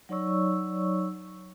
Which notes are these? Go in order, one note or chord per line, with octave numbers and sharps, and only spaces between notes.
F#3 D#4 C#5 D5 C#6 E6